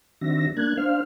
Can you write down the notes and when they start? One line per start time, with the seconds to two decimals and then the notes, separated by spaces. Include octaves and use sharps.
0.21 D#3 C4 D4 F#4 E5 A#6
0.57 A#3 D4 F#6 G#6
0.77 D4 C5 F5 F6